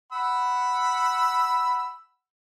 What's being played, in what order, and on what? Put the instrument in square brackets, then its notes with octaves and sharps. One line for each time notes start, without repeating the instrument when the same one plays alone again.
[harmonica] F#5 B5 E6